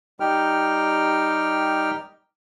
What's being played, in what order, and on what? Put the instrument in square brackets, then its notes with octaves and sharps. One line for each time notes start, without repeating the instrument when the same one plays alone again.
[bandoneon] G3 D#4 G4 G5 F6